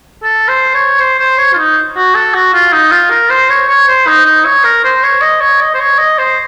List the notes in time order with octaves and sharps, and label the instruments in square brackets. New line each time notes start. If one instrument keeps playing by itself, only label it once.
[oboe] A4
C5
C#5
C5
C5
C#5
F4
D#4
F#4
A4
F#4
F4
D#4
F4
A#4
C5
C#5
C#5
C5
D#4
D#4
C#5
A#4
C5
C#5
D#5
C#5
D#5
C5
C#5
D#5
C5